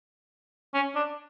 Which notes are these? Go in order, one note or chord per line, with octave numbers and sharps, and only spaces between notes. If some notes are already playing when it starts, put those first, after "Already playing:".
C#4
D4